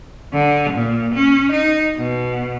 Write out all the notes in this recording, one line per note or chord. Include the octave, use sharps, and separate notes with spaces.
D3
A#2
C#4
D#4
B2